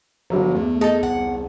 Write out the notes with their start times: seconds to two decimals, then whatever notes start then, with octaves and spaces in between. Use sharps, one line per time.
0.30 G1 F3 F#3 A#5
0.55 E2 A3
0.81 D#4 G#4 A4 A5
1.03 C2 F#5